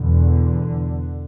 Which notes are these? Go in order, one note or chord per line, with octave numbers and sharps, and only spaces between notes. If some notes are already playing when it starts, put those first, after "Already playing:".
Already playing: E2 B2 D3